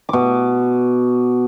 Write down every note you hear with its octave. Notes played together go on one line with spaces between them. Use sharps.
B2 D6